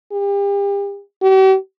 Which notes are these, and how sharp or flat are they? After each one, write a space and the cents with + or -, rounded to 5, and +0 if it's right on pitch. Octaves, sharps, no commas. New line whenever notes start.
G4 +35
G4 -45